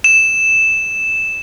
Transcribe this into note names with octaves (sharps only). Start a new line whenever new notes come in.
E7